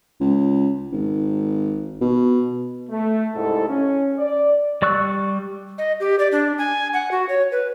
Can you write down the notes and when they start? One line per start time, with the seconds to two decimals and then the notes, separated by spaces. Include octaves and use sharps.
0.20 C#2
0.92 G#1
2.01 B2
2.90 A3
3.34 C2 G#2 E4 A4
3.68 C#4
4.18 D5
4.82 G3 D5 C#6 E6 F#6
5.78 D#5
6.00 G4
6.19 D5
6.32 D4
6.58 G#5
6.93 F#5
7.11 F#4
7.29 C#5
7.51 B4